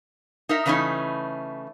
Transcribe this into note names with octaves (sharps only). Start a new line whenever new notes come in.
D#4 A#4 E5
C#3 E3 A3 C#4 D#4